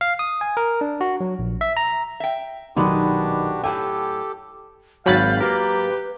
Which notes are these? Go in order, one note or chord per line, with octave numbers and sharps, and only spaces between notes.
F5
D#6
G#5
A#4
D4
F#4
F#3
A#1
E5
A#5
E5 G5
B1 A#2 D#3 B3 D4 F#4 G4 C6
A2 F#3 G4 A4 G5 G#5
G#1 F#3 F#4 F5 G#5 B5 G6 A6
A#3 G4 A#4 B4